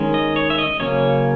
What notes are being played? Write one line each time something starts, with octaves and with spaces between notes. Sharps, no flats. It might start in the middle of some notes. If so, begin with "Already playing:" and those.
Already playing: D#3 G#3 C#4
D#5
C#5
E5
D#5
C#3 F#3 A#3 C#4 C#5